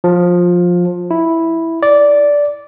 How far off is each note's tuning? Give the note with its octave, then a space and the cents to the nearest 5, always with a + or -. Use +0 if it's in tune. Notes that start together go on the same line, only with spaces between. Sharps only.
F3 +15
E4 -5
D5 -10